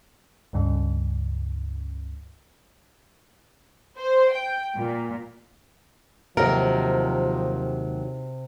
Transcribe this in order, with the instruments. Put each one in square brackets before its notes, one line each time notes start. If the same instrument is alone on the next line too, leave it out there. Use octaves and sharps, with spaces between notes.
[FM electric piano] C#2 G2 C#3
[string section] C5
G5
A#2
[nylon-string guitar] D#2 F#3 D#4 [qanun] C3 [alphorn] F3 [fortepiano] A#4